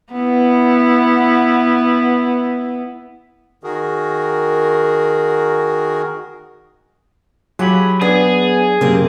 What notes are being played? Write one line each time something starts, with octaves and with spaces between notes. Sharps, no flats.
B3 E4
D#3 F#4 G#4 A#4
F#3 F4 G4 G#4 B5
B3 D4 G#4
F#2 C3 A#3 C4